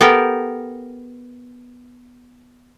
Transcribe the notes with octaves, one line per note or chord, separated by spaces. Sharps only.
B3 G4 A4 A#4 G5